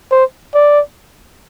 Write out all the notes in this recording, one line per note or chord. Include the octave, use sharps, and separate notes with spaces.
C5
D5